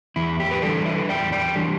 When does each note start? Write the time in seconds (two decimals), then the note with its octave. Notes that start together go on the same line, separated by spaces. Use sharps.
0.16 E2 E4
0.40 G4
0.51 B4
0.62 E3 G3 D4 A4 D5
0.86 B4 E5
1.09 E2 D5 G5
1.32 D5 G5
1.56 E3 G3 D4 G4